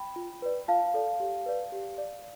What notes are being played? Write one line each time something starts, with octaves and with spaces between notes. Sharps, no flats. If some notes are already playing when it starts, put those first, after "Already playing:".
Already playing: G5 B5
F4
B4 D5
F4 F5 A5
A4 D5
G4
B4 D5
G4
D5